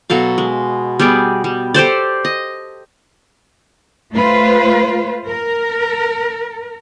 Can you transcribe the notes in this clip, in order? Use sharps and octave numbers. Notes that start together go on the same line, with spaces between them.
B2 F#3 A4 F5
G#3
G3 B3 G#4 D5
G3
G4 A4 C5 D5
D#5
A3 F4 B4 C5
A#4